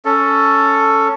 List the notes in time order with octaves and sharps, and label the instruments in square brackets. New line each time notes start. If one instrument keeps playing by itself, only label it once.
[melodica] C#4 A4